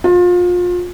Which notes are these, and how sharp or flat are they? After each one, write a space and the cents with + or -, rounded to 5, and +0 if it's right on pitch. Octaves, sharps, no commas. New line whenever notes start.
F4 +30